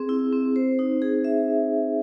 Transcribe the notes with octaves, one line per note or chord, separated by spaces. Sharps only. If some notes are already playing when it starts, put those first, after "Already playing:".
Already playing: C4 G#4
E4
C4
C5
D#4
G#4
E5